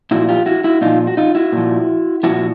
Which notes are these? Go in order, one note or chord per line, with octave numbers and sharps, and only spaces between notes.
A#2 F3 E4 F#4
F4 G4
E4 F#4
E4 F#4
A#2 F3 D#4 F4
F#4
D#4 F4
E4 F#4
A#2 F3
A#2 F3 E4 F#4